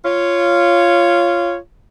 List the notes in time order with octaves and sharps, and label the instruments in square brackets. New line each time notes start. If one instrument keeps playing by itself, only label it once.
[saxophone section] F4 C#5